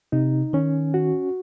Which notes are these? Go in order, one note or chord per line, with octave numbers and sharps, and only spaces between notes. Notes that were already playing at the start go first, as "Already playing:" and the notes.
C3 D#4
D#3 C#4
F#4